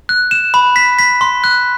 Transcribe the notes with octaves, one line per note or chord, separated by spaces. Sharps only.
F#6
E7
B5
B6
B6
C6
F#6